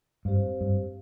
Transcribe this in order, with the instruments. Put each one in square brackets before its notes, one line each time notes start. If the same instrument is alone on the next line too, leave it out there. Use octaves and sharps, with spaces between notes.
[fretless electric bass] G2 [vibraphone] C4 G4 C5 F5
[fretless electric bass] G2